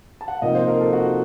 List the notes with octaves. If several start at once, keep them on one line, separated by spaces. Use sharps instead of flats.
A5
F#5
F5
C3 F3 A#3 D#4 D#5
C5
A#4
A4
F#4